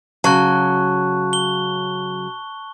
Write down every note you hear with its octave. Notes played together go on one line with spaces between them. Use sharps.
C#3 F#3 A5 C#6 F#6
G7